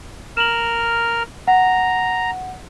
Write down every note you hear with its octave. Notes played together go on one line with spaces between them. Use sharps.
A#4 F6 E7 F#7
F#5 A#5